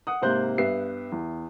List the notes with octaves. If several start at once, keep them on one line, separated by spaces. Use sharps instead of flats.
F#5 D#6
G#2 C3 A#3 C5 F#6 G6
G2 B3 E5 C7
E2